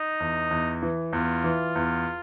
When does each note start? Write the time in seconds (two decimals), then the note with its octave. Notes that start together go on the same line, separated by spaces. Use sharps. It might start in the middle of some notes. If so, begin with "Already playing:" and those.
Already playing: D#4
0.20 E2
0.51 E2
0.82 E3
1.12 E2 F4
1.44 E3
1.75 E2